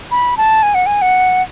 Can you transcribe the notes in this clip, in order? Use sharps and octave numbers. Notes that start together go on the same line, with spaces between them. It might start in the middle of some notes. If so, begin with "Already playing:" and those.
B5
A5
G#5
F#5
G#5
F#5